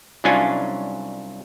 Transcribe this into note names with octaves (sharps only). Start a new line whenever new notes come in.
C2 F#3 C#4 D4 F4 G#5